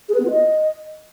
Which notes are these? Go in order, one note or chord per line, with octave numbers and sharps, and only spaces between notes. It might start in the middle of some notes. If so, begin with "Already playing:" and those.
G#4
B4
B3
F4
D#5